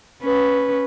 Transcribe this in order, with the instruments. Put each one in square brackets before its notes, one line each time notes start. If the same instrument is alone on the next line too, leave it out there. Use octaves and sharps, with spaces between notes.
[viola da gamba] C#4 B4